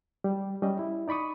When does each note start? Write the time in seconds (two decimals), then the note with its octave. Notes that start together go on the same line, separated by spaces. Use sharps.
0.24 G3
0.62 G3 C#4 D#5
0.79 E4
1.08 D#4 D5 B5 C#6 D#6